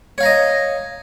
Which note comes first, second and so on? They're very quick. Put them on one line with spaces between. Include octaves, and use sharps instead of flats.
C#5 F5 A#5 D#5